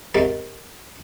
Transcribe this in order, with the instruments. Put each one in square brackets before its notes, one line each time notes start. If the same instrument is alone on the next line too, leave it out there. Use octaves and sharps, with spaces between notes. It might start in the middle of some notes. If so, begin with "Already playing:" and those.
[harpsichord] G#2 C3 D#3 D5 A#5